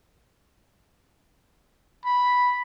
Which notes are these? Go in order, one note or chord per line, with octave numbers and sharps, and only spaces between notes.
B5